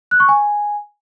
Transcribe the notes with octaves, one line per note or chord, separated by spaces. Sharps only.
F#6
C#6
G#5